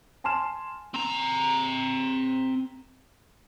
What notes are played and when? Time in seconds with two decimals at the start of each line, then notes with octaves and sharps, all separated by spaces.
0.24 G#5 A5 C6 F6 E7
0.94 C4 A#5